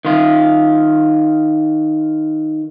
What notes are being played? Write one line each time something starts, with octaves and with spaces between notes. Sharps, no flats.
D#3 F4